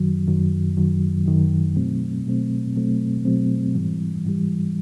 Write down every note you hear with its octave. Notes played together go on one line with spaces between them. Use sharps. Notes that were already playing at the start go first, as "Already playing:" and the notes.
Already playing: F#2 D#3 F#3
F#2 D#3 F#3
F#2 D#3 F#3
F#2 D#3 F#3
B2 F#3 A3 C4
B2 F#3 A3 C4
B2 F#3 A3 C4
B2 F#3 A3 C4
G#2 E3 G3
G#2 E3 G3